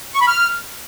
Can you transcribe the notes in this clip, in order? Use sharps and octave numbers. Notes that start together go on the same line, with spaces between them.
C#6
B5
F6